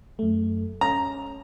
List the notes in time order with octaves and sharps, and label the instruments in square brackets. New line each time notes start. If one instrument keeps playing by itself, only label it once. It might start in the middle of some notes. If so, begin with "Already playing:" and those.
[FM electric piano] F#2 A3
[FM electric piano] C#4 [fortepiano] A#5